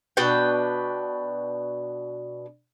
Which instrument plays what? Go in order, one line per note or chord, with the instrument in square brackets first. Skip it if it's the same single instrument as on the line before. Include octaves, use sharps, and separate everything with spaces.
[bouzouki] B2 D4 B4 G5